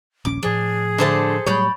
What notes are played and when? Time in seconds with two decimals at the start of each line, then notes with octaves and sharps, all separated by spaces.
0.25 D#1 A#1 C#4 D6
0.43 A2 F3 D4 G#4
0.98 D3 A3 A4 C5 A5
1.46 A2 F#3 G3 C#5 D5 B5 G6